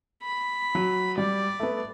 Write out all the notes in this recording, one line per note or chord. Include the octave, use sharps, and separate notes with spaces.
B5
F#3
G3 D5
A3 B3